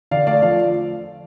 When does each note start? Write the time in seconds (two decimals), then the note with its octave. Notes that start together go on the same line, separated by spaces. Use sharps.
0.11 D3 D5 F5
0.27 A3 D5 F5
0.42 F3 D5 F5